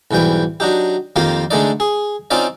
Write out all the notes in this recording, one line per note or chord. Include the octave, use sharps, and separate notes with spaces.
B1 G#2 E3 G3 G5
F#3 D4 D#4 G4
F2 D#3 A#3 F4 G4 F5
D3 G#3 A3 D#4 D5
G#4
C4 C#4 D#4 F4 D5